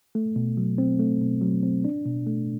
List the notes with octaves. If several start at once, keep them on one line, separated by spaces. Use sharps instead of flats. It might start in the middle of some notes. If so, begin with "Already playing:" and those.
A3
B2
F#3
C4
A3
B2
F#3
C4
D4
B2
A3